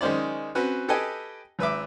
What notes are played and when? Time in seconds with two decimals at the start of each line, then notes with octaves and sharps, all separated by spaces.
0.01 D#3 G#3 C#4 C5 D5
0.55 C4 C#4 F#4 B4
0.88 G4 A4 B4 D#5 G5 G#5
1.59 G#1 B4 E5 D6